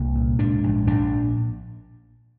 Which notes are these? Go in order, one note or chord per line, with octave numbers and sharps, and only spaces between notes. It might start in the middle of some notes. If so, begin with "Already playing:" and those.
Already playing: C2 A#3
A#2
G#2 D4
A#1
A#1 D4